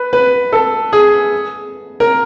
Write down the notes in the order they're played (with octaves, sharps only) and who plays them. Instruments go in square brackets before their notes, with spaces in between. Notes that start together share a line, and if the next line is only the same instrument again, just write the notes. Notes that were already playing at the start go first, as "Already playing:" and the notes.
Already playing: [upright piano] B4
B4
A4
G#4
A#4